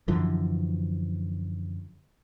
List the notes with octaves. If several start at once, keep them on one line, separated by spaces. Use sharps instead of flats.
F#2 D3 E3 F3